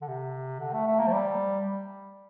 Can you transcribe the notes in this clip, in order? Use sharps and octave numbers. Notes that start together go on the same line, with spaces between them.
D3
C3
D3
A3
A3
A#3
F3
G3